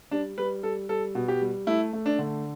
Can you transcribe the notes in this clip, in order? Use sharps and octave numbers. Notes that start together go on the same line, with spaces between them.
G3 D4
G3 B4
G3 A4
G3 A4
B2
G4
G3
A3 E4
A3
D4
D3